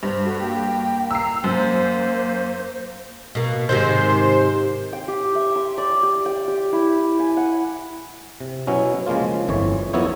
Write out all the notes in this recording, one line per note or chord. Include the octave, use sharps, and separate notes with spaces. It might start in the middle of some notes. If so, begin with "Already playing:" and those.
G2 C5
F#4 A4
A#3 G5
A#5 E6 C7
F#2 A#3 C5
B2 A#3
G#2 C3 D#3 C5
G5
G4
E5
C6
D5
G4
G5
G4
E4
G#5
F#5
C3
B2 F#3 B3 C#4 E4
C#3 F3 G#3 A#3 F4
G1 F2 E3 C#5
F2 A#3 B3 E4 C#5